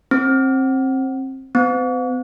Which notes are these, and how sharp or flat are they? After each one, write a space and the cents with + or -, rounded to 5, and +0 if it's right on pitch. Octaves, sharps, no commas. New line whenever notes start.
C4 +25
C4 -45